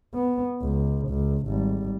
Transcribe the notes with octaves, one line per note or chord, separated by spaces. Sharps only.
B3
C#2
C#2
G#1 G3